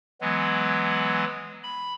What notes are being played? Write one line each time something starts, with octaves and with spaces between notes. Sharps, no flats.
E3 F#3 G#3 B3
B5